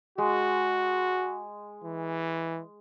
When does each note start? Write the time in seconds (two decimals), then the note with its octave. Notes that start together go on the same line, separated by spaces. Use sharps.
0.18 G#3 F#4
1.84 E3